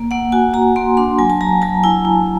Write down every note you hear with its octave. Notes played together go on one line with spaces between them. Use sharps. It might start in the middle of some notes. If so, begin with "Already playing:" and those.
Already playing: A#3
A#3 F#5
F#4 G#5
F#4 A#5
A#3 C6
D4 C6
F#3 G#5
A5
F#3 A#5
F#3 A5
E4 G#5
E4